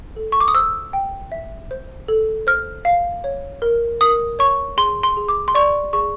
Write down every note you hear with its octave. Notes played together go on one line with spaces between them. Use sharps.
A4
C#6
D6
D#6
C5 E6
G5
E5
C5
A4
C5 F6
F5
C#5
A#4
A#4 D#6
C#5 C#6
G#4 C6
C6
G#4
D6
C6
D5 C#6
G#4 C#6